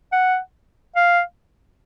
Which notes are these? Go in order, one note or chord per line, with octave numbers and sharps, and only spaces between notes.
F#5
F5